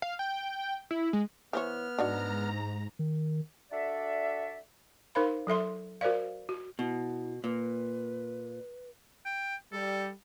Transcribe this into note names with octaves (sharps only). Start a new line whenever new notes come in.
F5
G5
E4
G#3
E3 B3 C5 C#5 F6
G#2 D4 D#4 F#4 A#5
D#3
D4 F#4 A4 D5 E5
D#4 A#4 C5 F5 B5
F#3 A4 E5 C6
F#4 A#4 C5 D5 F5
F#4
B2 E4
A#2 B4
G5
G3 A4